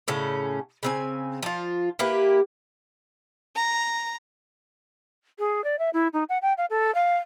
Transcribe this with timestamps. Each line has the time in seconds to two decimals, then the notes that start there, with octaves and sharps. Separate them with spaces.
0.08 A2 C#3 C#4
0.83 C#3 C4 G#5
1.43 F3 F4
1.99 A#3 E4 G4 B4
3.55 A#5
5.39 G#4
5.64 D5
5.79 E5
5.93 E4
6.13 D#4
6.29 F#5
6.42 G5
6.58 F5
6.70 A4
6.95 F5